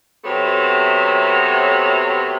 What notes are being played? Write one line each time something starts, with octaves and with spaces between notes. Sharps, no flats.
C3 F#3 A3 B3